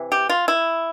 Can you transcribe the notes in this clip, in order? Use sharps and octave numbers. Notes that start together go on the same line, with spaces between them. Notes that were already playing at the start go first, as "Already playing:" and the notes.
Already playing: C3 E3
G4
F4
E4